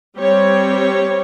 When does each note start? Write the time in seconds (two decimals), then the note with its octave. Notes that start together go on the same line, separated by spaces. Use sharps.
0.18 G3 C4 G4 C#5